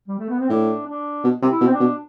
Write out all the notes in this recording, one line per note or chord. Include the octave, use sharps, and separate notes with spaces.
G3
A3
B3
C4
A2 D4
D4
B2
C3
E4
B2
C4
D4
B2